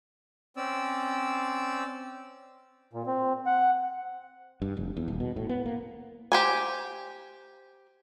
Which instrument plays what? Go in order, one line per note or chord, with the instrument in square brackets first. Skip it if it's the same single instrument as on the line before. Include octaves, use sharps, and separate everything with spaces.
[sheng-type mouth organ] C4 C#4 D5 E6
[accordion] A#2
C4
F#5
[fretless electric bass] G2
F1
E2
D#1
B2
A2
B3
A#3
[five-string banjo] G4 C5 G#5